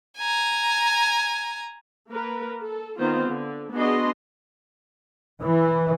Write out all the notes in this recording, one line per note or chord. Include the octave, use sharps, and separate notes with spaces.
G#5 A#5
A#3 A#4 B4
A4
D#3 B3 C4 F4 C5
D3
B3 D4 F#4 G#4 D#5 C6
E3